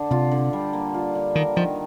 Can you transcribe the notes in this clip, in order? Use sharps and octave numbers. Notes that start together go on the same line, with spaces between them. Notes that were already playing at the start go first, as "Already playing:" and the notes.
Already playing: D3 D4
C3 F4
D3
G3
A#3
F4
D3
D#3 A#4
D#3 F3